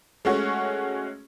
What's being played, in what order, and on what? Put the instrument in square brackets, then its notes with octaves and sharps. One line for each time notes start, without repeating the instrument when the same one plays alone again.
[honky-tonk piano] G#3 A3 C#4 F#4